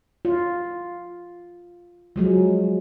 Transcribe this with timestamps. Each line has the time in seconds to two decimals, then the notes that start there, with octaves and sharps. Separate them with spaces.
0.25 F4
2.16 F3 F#3 G#3